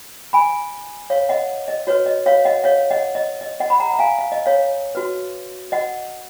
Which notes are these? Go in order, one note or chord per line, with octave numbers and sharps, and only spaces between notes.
G#5 B5
C#5 F5
D#5 F#5
D#5
F#4 B4 C#5
D#5
C#5 F5
D#5 F#5
C#5 F5
D#5 F#5
D#5
D#5
D#5 F#5
B5
F#5 A#5
A#5
F5 G#5
F5
D#5
C#5 F5
F#4 B4
D#5 F#5